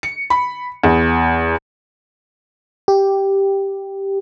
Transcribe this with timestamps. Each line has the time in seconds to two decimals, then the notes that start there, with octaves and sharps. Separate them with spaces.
0.03 C#7
0.30 B5
0.84 E2
2.88 G4